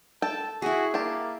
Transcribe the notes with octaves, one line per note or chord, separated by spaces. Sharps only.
A4 G5 A5
E4 F#4 G#4
A#3 G4 A5